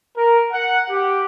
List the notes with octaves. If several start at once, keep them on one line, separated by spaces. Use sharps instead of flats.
A#4
F#5
G4